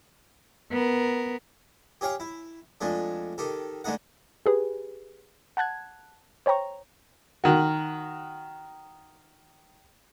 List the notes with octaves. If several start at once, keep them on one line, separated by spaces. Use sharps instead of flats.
B3 A#4
G4 G#4 C#5 F5 G5
E4
F2 G#3 A3 D4
D#3 G4 A4
D3 G#3 A3 D#4 F#5
G4 G#4 B4
F#5 A5 F#6 G#6
C5 C#5 G5 A#5 C#6
D#3 F#4